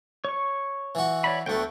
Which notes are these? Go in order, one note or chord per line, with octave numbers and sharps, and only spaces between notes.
C#5 C#6
E3 F#4
C#5 D5 B5
D2 A3 B3 F#4 G5